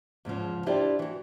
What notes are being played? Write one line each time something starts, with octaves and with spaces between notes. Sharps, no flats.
E2 G#2 C#3 F3
D4 E4 F4 G4 C5 D5
E3 F#4